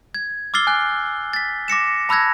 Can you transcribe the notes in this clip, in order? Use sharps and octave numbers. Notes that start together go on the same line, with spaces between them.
G#6
D6 E6 F6 A6 C7 G7
G#5 F#6
A6 B6
D6 A#6 C#7 E7
A5 B5 E6 F#6 G#6 A#6